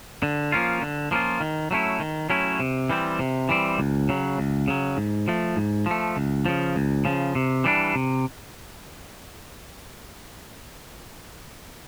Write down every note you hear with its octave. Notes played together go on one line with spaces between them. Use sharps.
D3
F3 A#3 C#4 F4
D3
F3 A#3 C#4 F4
D#3
F#3 A3 C#4 E4
D#3
F#3 A3 C#4 E4
C3
E3 G3 C4
C3
E3 G3 C4
C#2
C#3 F#3
C#2
C#3 F#3
G#2
F3 A3
G#2
F3 A3
C#2
C#3 F3
C#2
C#3 F3
C3
E3 G3 B3 D4
C3